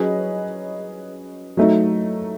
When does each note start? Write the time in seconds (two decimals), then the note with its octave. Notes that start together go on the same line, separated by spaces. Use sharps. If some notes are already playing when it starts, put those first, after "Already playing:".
Already playing: F#3 C#4 G#4 B4 D#5
1.57 F#3 A3 D#4